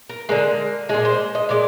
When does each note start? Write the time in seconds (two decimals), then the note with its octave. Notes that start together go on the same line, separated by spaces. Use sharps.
0.09 A#4
0.29 D3 G#3 A#4
0.89 A#2 G#3 G#4
1.05 C5
1.35 D#5
1.49 A#2 G#3 D5